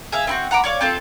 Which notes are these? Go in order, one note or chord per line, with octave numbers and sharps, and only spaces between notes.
G#4 E5 F5
C4 E4 F#4
F#5 A#5 B5 D6
C#5 D5 F5
C4 F4 A4